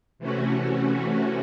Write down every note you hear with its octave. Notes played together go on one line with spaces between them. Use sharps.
C3 E3 A3 C#4 F#4